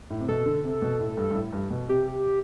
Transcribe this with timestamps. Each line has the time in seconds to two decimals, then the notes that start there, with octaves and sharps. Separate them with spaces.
0.10 A2
0.20 C3
0.28 B2 A4
0.46 D3
0.64 C3
0.82 B2
1.00 A2
1.17 G2
1.30 G2
1.35 A2
1.53 G2
1.71 B2
1.88 C3 G4